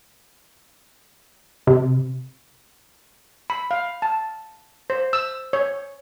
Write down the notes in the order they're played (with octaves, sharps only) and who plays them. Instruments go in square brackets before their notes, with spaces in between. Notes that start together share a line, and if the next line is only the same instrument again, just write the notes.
[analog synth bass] C3
[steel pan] B5
F5
A5
C5
E6
C#5